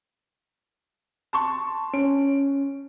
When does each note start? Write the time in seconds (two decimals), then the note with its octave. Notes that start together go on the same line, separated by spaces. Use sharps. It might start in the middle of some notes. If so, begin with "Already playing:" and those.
1.33 A5 C6 C#6
1.94 C#4 D7